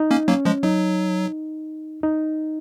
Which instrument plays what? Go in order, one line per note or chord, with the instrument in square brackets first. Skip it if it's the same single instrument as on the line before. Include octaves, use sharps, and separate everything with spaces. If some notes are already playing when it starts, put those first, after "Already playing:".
Already playing: [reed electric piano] D#4
[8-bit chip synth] A#3 C#4
[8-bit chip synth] F#3 A#3 [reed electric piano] C#4
[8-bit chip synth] F3 G#3
[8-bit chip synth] F#3 [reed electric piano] D#4
[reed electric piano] D#4